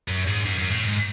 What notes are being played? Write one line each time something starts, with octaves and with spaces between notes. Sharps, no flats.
F#2
G#2
F#2
F#2
A2
G#2